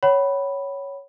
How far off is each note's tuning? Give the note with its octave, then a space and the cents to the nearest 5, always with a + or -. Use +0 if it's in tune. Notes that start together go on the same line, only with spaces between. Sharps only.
C#5 +0 F#5 +35 B5 +0